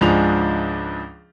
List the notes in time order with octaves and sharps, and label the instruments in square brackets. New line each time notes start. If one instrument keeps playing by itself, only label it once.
[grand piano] C#2 G#2 F3 D4 G#4 F7